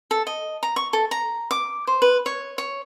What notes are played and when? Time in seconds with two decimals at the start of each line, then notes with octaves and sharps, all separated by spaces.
0.11 A4
0.27 D#5
0.63 A#5
0.76 C#6
0.93 A4
1.11 A#5
1.51 D6
1.87 C5
2.02 B4
2.26 C#5
2.58 C#5